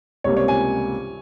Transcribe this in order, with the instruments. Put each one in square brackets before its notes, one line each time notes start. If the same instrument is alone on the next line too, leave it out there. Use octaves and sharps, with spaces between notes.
[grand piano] C#2 C3 G3 A#3 [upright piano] C#5
[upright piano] C#5
G#5